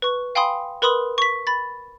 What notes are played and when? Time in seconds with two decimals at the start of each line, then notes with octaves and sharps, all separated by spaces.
0.02 B4 C#6
0.35 F5 G5 G#5 B5 C6 D#6
0.82 A#4 B4 B5 C6 D#6 F#7
1.18 C#6 B6
1.47 B5 A6